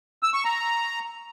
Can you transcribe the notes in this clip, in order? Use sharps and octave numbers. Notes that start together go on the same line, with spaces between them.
E6
C#6
A#5